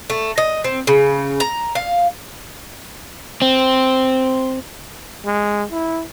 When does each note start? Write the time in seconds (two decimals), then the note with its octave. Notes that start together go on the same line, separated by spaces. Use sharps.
0.10 A3
0.38 D#5
0.64 C4
0.87 C#3
1.40 A#5
1.75 F5
3.42 C4
5.26 G#3
5.71 E4